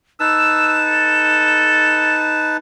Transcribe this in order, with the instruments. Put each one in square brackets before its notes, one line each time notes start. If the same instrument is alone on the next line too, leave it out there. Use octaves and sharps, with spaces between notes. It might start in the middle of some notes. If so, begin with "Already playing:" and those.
[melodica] D#4 B4 A5 [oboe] E6 [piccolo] E7
[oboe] A4